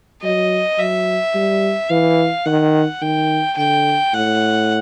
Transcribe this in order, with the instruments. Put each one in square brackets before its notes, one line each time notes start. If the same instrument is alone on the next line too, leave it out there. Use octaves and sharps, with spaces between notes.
[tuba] F#3 [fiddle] D#5
[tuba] F#3 [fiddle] E5
[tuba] G3
[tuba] E3 [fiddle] F5
[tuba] D#3 [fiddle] F#5
[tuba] D#3 [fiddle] G5
[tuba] D3 [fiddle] G5
[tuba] A2 [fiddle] F#5